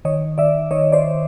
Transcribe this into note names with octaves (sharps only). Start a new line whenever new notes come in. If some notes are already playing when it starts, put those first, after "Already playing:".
D#3 C#5 D#5
D#3 D5 E5
D#3 C#5 D#5
C5 D5